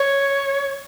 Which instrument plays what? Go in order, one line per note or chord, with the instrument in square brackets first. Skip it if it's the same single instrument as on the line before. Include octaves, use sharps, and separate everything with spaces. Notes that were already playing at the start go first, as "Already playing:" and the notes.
Already playing: [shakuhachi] C#5